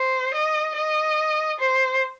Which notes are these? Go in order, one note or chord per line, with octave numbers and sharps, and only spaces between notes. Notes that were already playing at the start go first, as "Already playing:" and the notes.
Already playing: C5
D#5
D#5
C5